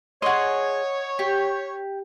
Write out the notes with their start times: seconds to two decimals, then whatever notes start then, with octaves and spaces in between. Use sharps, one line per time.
0.22 G#4 C#5 D#5 F#5 C6
1.19 G4